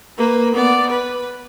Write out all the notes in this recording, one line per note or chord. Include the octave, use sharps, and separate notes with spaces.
A#3 B4
B3 D5
B4